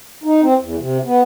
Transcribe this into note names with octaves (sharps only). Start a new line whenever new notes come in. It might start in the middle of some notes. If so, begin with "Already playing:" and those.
D#4
C4
E2
C3
B3